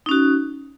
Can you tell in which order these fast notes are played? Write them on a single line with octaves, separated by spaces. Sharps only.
D#4 C#4 F#4